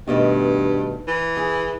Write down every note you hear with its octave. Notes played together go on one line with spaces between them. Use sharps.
G2 B2 D#3 A3
E3
G#4